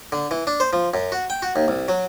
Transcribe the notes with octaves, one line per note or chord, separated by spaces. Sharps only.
D3
E3
D4
C5
F3
F#2
F#4
G5
F#4
D#2
C2
F#3